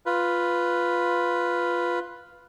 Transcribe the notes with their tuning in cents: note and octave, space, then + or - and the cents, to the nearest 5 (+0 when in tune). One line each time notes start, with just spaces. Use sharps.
F4 +0 B4 +0